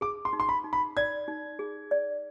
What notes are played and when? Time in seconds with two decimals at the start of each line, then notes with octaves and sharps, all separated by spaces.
0.01 G#4 D6
0.25 C6
0.33 D#4
0.40 C6
0.49 B5
0.64 D#4
0.73 B5
0.97 D5 G#6
1.28 D#4
1.59 G#4
1.91 D5